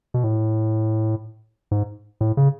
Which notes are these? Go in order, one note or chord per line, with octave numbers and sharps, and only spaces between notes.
B2
A2
G#2
A2
C#3